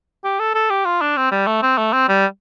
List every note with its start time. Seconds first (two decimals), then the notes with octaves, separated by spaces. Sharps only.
0.24 G4
0.40 A4
0.55 A4
0.70 G4
0.86 F4
1.02 D4
1.17 C4
1.32 G3
1.47 A3
1.63 C4
1.78 A3
1.93 C4
2.09 G3